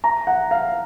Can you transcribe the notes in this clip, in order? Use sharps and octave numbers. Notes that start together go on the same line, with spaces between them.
A#5
F#5
F5